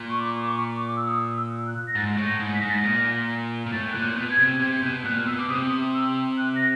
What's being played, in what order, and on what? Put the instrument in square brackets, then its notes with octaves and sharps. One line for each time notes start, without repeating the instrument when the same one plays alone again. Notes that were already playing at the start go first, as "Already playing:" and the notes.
Already playing: [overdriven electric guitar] A#2
[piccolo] C#6
D6
D6
C#6
D6
E6
D#6
E6
F#6
A#6
[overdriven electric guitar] G#2 [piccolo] A6
[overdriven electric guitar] A2
[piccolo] A#6
[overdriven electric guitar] G#2
[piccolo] B6
[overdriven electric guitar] G#2 [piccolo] A#6
[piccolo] A6
A#6
[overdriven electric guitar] A#2
A#2
[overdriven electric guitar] A2 [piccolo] A6
[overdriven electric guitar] A#2 [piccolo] F#6
[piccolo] G6
[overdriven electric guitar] B2
[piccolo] G#6
[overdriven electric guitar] C3
[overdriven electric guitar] C3 [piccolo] G#6
[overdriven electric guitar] B2 [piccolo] G6
[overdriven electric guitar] A#2 [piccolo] F#6
[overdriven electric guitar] B2 [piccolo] E6
[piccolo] D6
[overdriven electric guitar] C3 [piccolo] D#6
[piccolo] E6
F#6
A#6